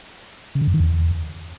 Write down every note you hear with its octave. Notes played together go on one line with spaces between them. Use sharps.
C#3
D3
F#2
D#3
E2